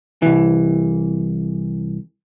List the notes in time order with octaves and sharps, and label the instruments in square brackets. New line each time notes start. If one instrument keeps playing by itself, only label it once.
[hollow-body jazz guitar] C2 E3